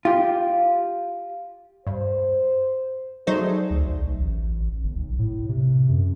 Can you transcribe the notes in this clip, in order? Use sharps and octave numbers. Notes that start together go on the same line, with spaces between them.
F4 G4
G2 C5
F#3 A3 D#4 G#4 C5 D5
D2
B1
A1
G1
B1
A2
C3
F#2